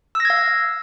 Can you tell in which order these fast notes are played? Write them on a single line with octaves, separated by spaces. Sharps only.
E6 A#6 G#6 F5